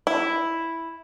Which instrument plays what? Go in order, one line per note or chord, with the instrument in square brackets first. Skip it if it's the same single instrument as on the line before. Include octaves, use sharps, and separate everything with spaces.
[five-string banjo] E4